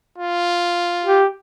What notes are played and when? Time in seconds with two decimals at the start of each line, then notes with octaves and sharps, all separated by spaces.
0.18 F4
1.04 G4